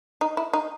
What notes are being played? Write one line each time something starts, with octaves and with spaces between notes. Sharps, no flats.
D#4
E4
D#4